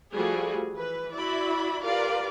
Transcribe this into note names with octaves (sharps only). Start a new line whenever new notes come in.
F3 G3 A3 F#4 G#4
E3 B4
E4 F#4 D5 B5
F4 G4 A#4 B4 D5 F5